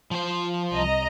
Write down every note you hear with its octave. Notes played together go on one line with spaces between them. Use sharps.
F3 C5
C2 D#5 A#5